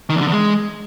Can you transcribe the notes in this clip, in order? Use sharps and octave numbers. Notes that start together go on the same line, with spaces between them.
D#3
E2
D3
E2
G#3